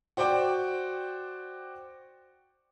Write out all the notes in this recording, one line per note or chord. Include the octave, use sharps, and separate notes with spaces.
F#4 C5 D5 G5 D6